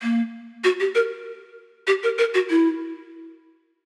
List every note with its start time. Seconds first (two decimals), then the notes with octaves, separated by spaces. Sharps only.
0.02 A#3
0.64 F#4
0.80 G4
0.95 A#4
1.87 G4
2.03 A#4
2.18 A#4
2.34 F#4
2.50 E4